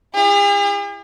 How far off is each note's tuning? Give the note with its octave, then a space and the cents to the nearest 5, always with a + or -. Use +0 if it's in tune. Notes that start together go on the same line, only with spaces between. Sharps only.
E4 +25 G#4 -45